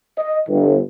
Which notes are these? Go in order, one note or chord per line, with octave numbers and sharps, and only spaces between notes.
D#5
G1